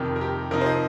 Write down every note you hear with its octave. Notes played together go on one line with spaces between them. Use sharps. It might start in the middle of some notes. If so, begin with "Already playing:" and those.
Already playing: F2 C3 D#3 G4
A#4
G4
C3 F3 D#4 A#4
C5
D#5